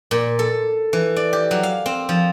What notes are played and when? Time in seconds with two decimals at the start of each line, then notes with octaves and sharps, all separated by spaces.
0.11 A#2
0.39 A4
0.93 E3
1.16 D5
1.33 G4
1.51 F#3
1.63 F5
1.86 C4
2.09 F3